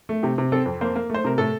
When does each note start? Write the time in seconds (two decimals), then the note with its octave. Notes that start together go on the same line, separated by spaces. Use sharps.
0.09 A3
0.23 C3 G4
0.38 C3
0.52 C4 A4
0.66 F2
0.81 A#3 C5
0.96 A#3
1.10 A3 C5
1.24 C3 A#4
1.38 A2 A4